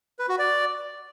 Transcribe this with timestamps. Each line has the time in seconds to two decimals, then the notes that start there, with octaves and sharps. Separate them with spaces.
0.19 B4
0.29 F#4
0.39 D5